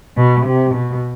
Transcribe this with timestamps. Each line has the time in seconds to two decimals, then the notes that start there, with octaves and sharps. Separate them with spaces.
0.17 B2
0.46 C3
0.74 B2